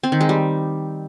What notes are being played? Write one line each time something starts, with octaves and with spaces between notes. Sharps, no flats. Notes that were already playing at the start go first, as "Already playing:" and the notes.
C4
D#3
G#3
G3